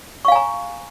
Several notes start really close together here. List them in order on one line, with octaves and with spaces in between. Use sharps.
C#6 F5 G#5 A#5